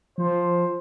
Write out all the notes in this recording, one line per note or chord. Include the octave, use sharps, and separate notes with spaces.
F3 C5